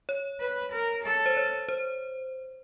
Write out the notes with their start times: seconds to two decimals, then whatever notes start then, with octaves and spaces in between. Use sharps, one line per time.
0.09 C#5
0.40 B4
0.72 A#4
1.04 A4
1.26 C5
1.37 C#5
1.69 C5